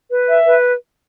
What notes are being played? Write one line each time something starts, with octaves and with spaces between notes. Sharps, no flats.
B4
E5
B4